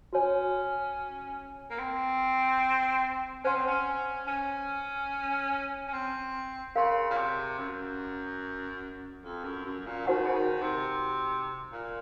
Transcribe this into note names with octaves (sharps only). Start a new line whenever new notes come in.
C#4 F#4 C#5 G#5
A#3
C4
C#4 C5 F#5 C6
C4
C#4
C#4
C#4
C4
C#3 A#4 F5 C6
A#2
C3
F#2
F2
F#2
F#2
A#2
D#3 D#4 F#4 C5 F#5 C#6
C#3
D#3
C3
A#2